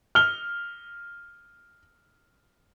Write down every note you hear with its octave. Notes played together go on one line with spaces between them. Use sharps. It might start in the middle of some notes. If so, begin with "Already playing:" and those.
F6 G7